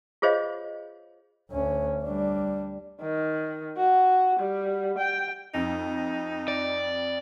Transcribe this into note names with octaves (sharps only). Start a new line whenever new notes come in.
F4 G#4 C5 C#5 D#5 F5
D2 C#4
G3 D4
D#3
F#4
G3
G5
F2 D#4
D5